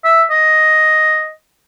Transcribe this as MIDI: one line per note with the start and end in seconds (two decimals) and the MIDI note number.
0.04 0.24 76
0.31 1.32 75